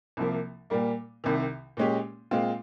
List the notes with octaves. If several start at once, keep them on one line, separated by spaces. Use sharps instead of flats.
C2 C3 F3 A#3
A#2 G3 A#3
C2 C3 D#3
A#2 G#3 C#4 G4
A#2 G#3 C4 F4